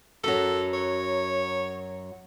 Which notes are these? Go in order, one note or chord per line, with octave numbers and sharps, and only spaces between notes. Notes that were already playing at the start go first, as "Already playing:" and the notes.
F#2 F#3 A4
C#5